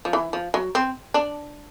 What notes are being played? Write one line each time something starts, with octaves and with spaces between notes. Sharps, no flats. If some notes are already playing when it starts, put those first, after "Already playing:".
F3
E3
F3
F#3
C4
D4